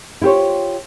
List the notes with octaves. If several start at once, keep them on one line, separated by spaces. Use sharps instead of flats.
E4 F4 G4 C5 C#5